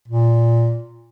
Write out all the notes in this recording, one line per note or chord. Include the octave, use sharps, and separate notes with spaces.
A#2